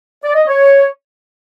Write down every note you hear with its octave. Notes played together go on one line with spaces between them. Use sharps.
D5
D#5
C#5